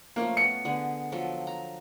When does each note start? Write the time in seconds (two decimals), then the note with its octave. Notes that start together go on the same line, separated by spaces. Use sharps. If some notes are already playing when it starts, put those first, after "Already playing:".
0.16 F3 A3 A#3 C#4
0.37 B3 C#7
0.65 D3 B3 G#4
1.12 F3 F#3 A4
1.47 A#5